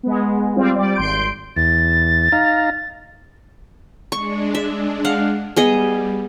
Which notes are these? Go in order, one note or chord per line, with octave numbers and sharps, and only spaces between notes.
G#3 B3
G3 C4 F4
G3 D5
G#1 C6 G6 D7
E2 A6
D#4 F5 A#5
G#3 D4 C#6
E5
F5 F#5
G3 B3 G#4 D#5